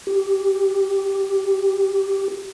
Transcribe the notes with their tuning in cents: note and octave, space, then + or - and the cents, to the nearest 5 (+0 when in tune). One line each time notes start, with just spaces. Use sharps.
G4 -5